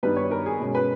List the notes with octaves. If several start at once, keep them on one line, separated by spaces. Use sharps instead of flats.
G2 D#3 G3 B3 D#4 B4
C#5
A#4
G#4
B2 G#3 C#4
B4